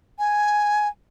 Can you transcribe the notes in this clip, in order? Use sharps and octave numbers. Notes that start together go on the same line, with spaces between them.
G#5